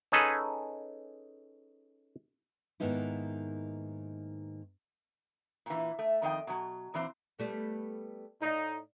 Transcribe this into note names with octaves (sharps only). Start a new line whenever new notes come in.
C#4 D#4 G#4 A4 B4
G#2 D#3 A#3 B3 D#4 E4
A#2 E3
A3
F2 D#3 D#5 G5
B2 F#3
A#2 E3 C4
G3 A3 B3
A2 D#4 D5 F5